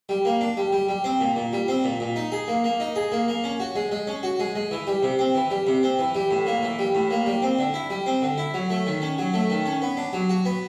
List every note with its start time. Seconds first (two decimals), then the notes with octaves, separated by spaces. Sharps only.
0.09 G3
0.25 A#3
0.41 D4
0.57 G3
0.72 G3
0.89 G3
1.04 C4
1.21 A#2
1.36 A#2
1.53 G3
1.68 C4
1.84 A#2
2.00 A#2
2.16 D#4
2.32 G#4
2.48 A#3
2.64 A#3
2.80 D#4
2.96 G#4
3.12 A#3
3.28 A#3
3.44 C#4
3.60 F#4
3.76 G#3
3.91 G#3
4.07 C#4
4.23 F#4
4.40 G#3
4.55 G#3
4.71 E3
4.87 G3
5.03 C3
5.19 C4
5.35 E3
5.51 G3
5.67 C3
5.83 C4
5.99 E3
6.15 G3
6.31 A2
6.46 A#3
6.63 E3
6.79 G3
6.95 A2
7.11 A#3
7.26 G3
7.42 C4
7.59 D3
7.74 E4
7.90 G3
8.06 C4
8.22 D3
8.38 E4
8.54 F#3
8.70 A3
8.86 D#3
9.02 C#4
9.18 F#3
9.34 A3
9.50 D#3
9.66 C#4
9.82 B3
9.97 D4
10.13 F#3
10.29 F#4
10.45 B3